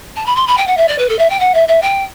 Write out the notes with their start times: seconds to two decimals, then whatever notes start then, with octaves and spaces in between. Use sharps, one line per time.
0.16 A5
0.26 B5
0.36 C6
0.47 B5
0.57 G5
0.67 F#5
0.77 E5
0.88 D5
0.98 B4
1.09 A4
1.19 E5
1.30 G5
1.40 F#5
1.54 E5
1.68 E5
1.82 G5